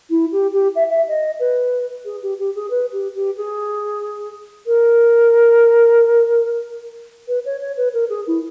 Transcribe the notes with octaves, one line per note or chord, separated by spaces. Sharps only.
E4
G4
G4
E5
E5
D#5
B4
G#4
G4
G4
G#4
B4
G4
G4
G#4
A#4
B4
C#5
C#5
B4
A#4
G#4
E4